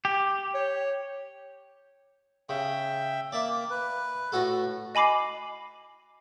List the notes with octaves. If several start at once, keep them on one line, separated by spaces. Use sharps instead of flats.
G4
C#5
C#3 E5 G5
A#3 D5 E5
B4
A2 F#4 A4
D#5 G#5 B5 D6 C7